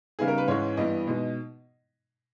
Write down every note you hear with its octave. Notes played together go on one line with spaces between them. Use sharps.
C#3 G3 B3 D#4 G#4
A#4
B4
G#2 E3 G#3 C#4 C#5
G2 E3 G3 B3 D#5
B2 G#3 D#4